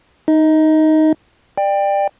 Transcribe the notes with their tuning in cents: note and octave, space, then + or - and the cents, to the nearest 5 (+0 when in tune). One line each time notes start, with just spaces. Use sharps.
D#4 +0 D#5 +25
D5 +20 G5 +15